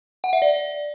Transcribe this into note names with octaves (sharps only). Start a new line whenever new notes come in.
F#5
E5
D5